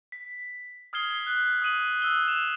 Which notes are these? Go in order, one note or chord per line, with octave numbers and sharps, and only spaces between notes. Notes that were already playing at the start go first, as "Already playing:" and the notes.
B6
D#6 F6 G#6 C7 G7
F#6
D#6 F6 D#7 F#7
D#6 E6 G7
E7 F7